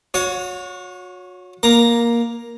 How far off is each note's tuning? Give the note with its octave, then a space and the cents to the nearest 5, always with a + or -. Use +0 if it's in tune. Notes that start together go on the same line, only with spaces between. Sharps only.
F#4 -35 C#5 +10
A#3 +10 A#5 +0